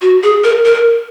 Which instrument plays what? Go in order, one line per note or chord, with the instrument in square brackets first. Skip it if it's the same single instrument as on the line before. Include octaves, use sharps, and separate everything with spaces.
[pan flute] F#4
G#4
A#4
A#4